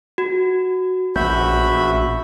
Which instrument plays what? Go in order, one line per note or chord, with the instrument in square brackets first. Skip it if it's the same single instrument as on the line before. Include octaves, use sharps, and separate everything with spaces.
[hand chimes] F#4
[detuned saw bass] A#1 [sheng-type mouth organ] F#4 E5 B5 [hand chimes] G6